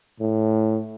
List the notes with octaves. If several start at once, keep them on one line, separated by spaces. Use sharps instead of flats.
A2